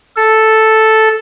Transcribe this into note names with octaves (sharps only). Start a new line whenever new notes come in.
A4